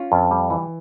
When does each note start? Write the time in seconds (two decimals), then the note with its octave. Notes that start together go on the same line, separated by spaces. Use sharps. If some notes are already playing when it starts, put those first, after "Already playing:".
Already playing: C#4 F4
0.12 F2
0.31 G3
0.50 E3